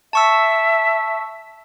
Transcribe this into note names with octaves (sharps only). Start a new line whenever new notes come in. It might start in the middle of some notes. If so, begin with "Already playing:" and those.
E5 A5 C#6 E6